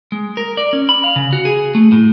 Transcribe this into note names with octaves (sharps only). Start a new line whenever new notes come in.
G#3
A#4
D5
C#4
B5
F5
C#3
F#4
G#4
A3
A2